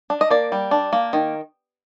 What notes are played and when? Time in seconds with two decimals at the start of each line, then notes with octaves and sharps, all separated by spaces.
0.10 D4
0.21 D#5
0.30 A#3 D5
0.52 G3
0.71 D4
0.93 A#3
1.13 D#3